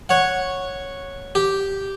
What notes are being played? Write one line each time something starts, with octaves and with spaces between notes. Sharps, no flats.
C#5 F#5
G4